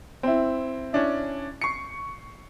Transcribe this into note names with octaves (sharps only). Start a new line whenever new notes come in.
C4 E4
C#4 D4 E4
C#6 C7 C#7